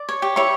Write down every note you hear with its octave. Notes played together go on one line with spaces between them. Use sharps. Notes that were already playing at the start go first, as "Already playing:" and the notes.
Already playing: D5
C#5
G4
E4 C#5 C#6